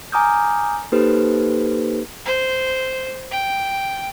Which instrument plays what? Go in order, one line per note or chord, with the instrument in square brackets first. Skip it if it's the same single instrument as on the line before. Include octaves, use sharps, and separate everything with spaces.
[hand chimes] G#5 A#5 D6 D#6 F6 G6
A#3 D#4 G4 A4 B4 C5
[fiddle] C5
G5